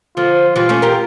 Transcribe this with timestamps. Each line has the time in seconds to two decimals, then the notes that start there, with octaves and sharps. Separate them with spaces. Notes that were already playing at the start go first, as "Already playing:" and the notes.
0.16 D3 F3 F4
0.56 E3 G3 F4
0.69 A3 C#4
0.82 G4 A#4